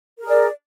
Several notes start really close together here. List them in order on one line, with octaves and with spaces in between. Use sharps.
A#4 G#4 D5